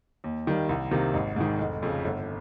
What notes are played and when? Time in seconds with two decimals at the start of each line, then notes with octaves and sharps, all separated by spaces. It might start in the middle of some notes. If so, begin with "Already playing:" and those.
0.24 D#2
0.47 D#3 G3 A#3
0.69 C2
0.91 C3 D#3 A#3
1.14 G#1
1.36 G#2 D#3
1.59 F1
1.82 F2 C#3
2.04 G1